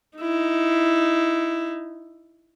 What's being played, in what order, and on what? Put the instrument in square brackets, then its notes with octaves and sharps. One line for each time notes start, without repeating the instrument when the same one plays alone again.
[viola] D#4 E4